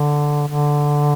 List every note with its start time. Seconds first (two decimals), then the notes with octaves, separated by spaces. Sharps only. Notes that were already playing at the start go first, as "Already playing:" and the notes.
Already playing: D3
0.48 D3